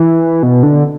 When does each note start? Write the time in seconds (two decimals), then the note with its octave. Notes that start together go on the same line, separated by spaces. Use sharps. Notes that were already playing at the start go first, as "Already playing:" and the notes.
Already playing: E3
0.43 B2
0.63 D3